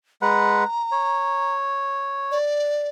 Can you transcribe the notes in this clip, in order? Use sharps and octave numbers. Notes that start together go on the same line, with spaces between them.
G#3 B4 F#5 A#5
C#5
D5